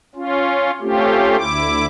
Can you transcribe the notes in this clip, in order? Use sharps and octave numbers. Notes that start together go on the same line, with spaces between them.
C#4 F4
A3 C4 C#4 F4 G4
D2 E4 D6